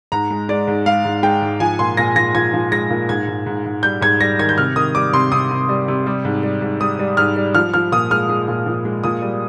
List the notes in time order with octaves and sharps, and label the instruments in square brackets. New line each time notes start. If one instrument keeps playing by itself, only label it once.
[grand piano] G#2 A#5
G#3
G#3 D5
G#2
G#3 F5
G#2
G#3 G5
G#2
F3 G#5
A#2 C6
A#2 A#6
F3 A#6
F3 G#6
F3
G#3 A#6
A#2
G#2 G#6
G#2
G#2
G#2
G3 G6
G#2 G#6
G3 A#6
D#3 G#6
G6
C3 F6
D#3 D#6
G3 D6
C3 C6
C3 D#6
C3
G3
C3
G3
G#2
G3
G#2
G3 D#6
G3
G#2 F6
G3
F3 F6
F3 F6
A#2 D#6
G#3 F6
G#3
A#2
F3
G#3
A#2 D#6
G3